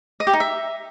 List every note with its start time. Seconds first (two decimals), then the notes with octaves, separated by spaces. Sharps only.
0.20 D#5
0.27 G4
0.34 D#4
0.40 E5